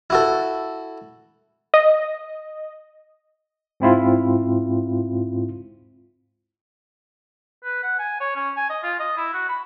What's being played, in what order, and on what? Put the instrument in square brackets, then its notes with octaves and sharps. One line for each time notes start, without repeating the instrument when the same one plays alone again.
[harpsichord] E4 F#4 A4
[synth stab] D#5
[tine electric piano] G#2 C4 E4 F4
[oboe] B4
F#5
G#5
C#5
C#4
G#5
D#5
F4
D#5
E4
F#4
B5